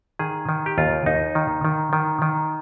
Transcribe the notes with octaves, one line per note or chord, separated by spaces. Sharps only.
D#3 G#4
D#3
G4
D#2 F4
D#2 D#4
D#3
D#3
D#3
D#3